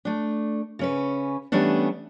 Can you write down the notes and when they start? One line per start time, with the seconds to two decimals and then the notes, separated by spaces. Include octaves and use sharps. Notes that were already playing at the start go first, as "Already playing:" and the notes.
0.05 A3 D4
0.79 C#3 C#4 B4
1.52 E3 G3 A3 B3 C#4 D4